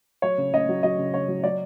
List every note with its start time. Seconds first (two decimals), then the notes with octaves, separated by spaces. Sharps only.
0.22 F#3 C#5
0.38 C#3
0.54 C#3 D#5
0.69 F#3
0.83 F#3 D#5
0.98 C#3
1.14 C#3 C#5
1.28 F#3
1.44 F#3 D5